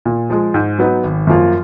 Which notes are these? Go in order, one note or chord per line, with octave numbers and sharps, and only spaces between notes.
A#2
F3 G#3
G#2
F#3 B3 D#4
G#1
F#2 F3 A#3 F4